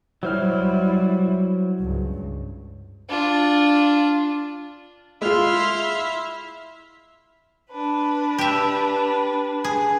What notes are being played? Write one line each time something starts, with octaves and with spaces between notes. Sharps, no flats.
F#3 G3 E4 C5 F6
C#2 G2
D4 F4
G#3 E4 F4 C6 F6
D4 B4
G4 E5
G#4